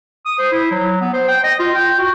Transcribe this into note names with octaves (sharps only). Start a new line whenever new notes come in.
D#6
C5
E4
F#3
B3
C5
G5
D#5
F4
G5
F#4